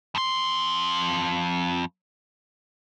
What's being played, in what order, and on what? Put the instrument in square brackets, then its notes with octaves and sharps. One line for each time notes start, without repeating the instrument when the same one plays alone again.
[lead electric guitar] F2 C6